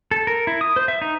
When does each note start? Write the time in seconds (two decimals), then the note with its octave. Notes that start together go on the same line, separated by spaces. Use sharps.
0.11 A4
0.27 A#4
0.47 E4
0.61 D#6
0.76 C5
0.88 E5
1.02 D#4